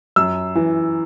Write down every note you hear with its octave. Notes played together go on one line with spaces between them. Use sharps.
F#2 E6
E3